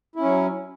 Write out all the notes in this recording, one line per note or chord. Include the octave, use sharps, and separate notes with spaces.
F#3 C#4 E4